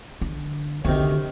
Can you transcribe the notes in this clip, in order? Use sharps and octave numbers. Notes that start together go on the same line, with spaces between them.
D3
D2 C3 D#3 C4 D4